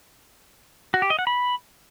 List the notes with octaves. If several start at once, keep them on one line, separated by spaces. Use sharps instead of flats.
F#4
G4
D#5
F#5
B5